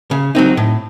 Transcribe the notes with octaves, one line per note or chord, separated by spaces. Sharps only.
C#3
F#3 C4 D#4
A2